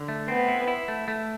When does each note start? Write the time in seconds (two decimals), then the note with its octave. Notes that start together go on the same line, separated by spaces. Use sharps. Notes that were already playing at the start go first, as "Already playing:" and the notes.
Already playing: D3
0.08 A3
0.28 B3 C4
0.48 E4
0.68 E4
0.88 A3
1.08 A3